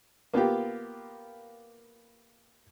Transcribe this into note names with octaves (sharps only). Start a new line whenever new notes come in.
A#3 B3 F4 G4